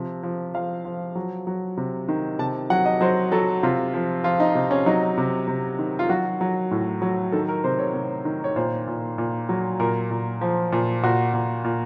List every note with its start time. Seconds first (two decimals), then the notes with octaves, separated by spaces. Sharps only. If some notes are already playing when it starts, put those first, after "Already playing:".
Already playing: C3 F3
0.23 F3
0.54 F3 F5
0.85 F3
1.15 F#3
1.47 F#3
1.77 C3
2.09 D#3
2.39 C3 A5
2.70 F#3 F#5
2.85 D#5
3.01 F#3 C5
3.32 F#3 A4
3.63 C3 F4
3.94 F3
4.24 F3 F4
4.40 D#4
4.55 C3
4.71 C#4
4.86 F#3 D#4
5.18 C3
5.48 C3
5.79 D#3
5.99 F4
6.09 F#3 F#4
6.41 F#3
6.71 A2
7.02 F#3
7.32 D#3 A4
7.49 A#4
7.64 C3 C5
7.79 C#5
7.94 C3
8.25 D#3
8.44 C#5
8.56 A#2 C5
8.88 A#2
9.18 A#2
9.49 F#3
9.80 A#2 A#4
10.11 A#2
10.41 F3
10.72 A#2
11.03 A#2 F#4
11.34 A#2
11.64 A#2